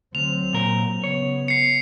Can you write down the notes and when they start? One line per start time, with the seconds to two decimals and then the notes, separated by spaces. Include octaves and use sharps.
0.15 D2 F#3 C4 F7
0.53 A#2 A#4
1.04 C#3 B3 C#5
1.48 C7 C#7